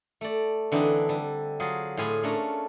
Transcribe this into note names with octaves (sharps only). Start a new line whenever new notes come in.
A3 D5
D3 E3 C4 D4 D#4
D3 G3
F#3 F4 G#4
A2 F4 G#4 G#5 B5 C6
A3 C#4 D4 A#4